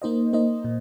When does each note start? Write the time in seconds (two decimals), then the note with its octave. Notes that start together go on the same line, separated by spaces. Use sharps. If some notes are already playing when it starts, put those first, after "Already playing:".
0.02 A#3 D#4 C5 D#5
0.33 A#3 D#4 C5 D#5
0.64 A#2